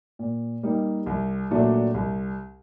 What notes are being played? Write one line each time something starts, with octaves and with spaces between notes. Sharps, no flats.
A#2
G3 A#3 D#4
C2
A#2 F#3 A3 D4
C2